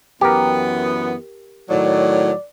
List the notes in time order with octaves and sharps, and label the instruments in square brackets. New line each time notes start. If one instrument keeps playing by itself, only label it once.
[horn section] F#2 E3 B3 [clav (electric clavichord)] G4 A#4
[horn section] A2 D#3 F#3 [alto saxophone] D5